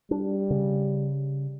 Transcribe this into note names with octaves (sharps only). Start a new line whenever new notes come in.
G3 D4
C#3